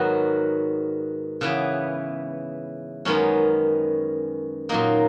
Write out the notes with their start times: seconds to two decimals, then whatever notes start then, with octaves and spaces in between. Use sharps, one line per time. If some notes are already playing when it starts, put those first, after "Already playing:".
Already playing: G#2 D#3 F#3 B3 F#4
1.41 C#3 E3 B3
3.05 F#2 D#3 G#3 B3 C#4
4.69 A#2 F#3 A#3 D#4